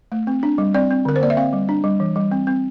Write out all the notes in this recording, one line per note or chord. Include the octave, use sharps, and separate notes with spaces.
A3
C4
D4
G3
C4 D5
C4
D3 A#4
C5
A#3 D5
E5
C4 F5
G3
D4
G3
E3
G3
C4
C4